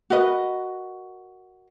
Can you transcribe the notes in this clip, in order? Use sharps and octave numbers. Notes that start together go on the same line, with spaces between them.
F#4 A#4 B4 D#5